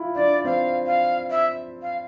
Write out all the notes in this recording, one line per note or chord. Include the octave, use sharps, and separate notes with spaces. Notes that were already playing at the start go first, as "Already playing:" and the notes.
Already playing: E4 F4
D4 D5
C4 F5
F5
E5
F5